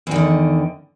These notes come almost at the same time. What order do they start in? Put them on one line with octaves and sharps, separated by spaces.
E2 D#3 D3